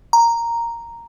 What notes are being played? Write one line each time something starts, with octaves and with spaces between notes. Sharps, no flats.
A#5